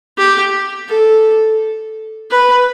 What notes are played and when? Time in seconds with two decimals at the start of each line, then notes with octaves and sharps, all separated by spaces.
0.18 G4
0.89 A4
2.31 B4